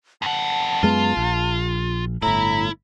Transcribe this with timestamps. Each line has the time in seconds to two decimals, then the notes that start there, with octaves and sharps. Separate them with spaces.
0.22 F2 F#5 A5
0.83 F#2 G#3 B3 F4
1.17 A#1
2.22 G1 A2 E4 A#5